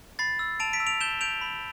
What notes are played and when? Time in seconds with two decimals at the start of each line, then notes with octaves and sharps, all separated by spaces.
0.19 B5 A6 C7
0.39 E6
0.60 A5 D7 F7
0.73 B6 D7
0.80 E6
0.87 D7 F7
1.01 G6 E7 G7
1.21 G6 D7 F7
1.41 B5